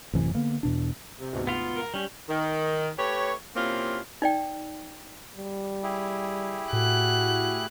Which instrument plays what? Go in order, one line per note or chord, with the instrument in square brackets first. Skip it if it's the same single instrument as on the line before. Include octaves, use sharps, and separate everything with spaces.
[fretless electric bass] A1 F#2 C3 E3
D3 A#3 B3
E2 B2 D4
[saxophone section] C3
[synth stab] D2 G#2 B2
[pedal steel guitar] B3 F4
[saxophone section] A#4
[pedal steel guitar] G3 [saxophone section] C#4
[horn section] D#3
A3 G4 B4 C#5
C3 A#3 C4 C#4 E4 F4
[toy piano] D#4 D5 G5
[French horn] G3
[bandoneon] E4 G4 G#4
[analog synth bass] A2 [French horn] F#4 [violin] F#6